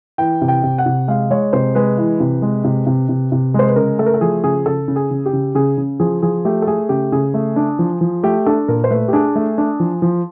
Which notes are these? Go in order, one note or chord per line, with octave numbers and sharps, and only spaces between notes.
E3 G5
C3
G5
C3
F#5
C3
G#3 F5
G#3 C#5
C3 C5
G#3 B4
E3
C3
G#3
C3
C3
C3
C3
G#3 C5
B4
C#3 A#4
A3 A4
A#4
A4
F3 G#4
C#3 G#4
C#3 A4
C#3
G#4
C#3
G4
C#3
C#3 G#4
C#3
F3 G#4
F3 G#4
A3 G4
A4
A3 G#4
C#3 G4
C#3 G#4
A3
D4
F3
F3
A3 G4
D4 A4
A#2 A#4
C5
A3 B4
G4
D4 G#4
A3
D4
F3
F3